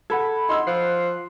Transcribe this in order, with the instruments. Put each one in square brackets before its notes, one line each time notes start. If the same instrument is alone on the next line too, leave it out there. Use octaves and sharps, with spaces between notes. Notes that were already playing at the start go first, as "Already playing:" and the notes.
[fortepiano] A4 [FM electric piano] F#5 B5 G#6
[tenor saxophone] D#4 [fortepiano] C6 E6
[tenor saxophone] F3 [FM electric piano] F#6 C7